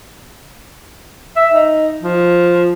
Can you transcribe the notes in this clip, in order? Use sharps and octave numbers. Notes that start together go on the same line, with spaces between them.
E5
D#4
F3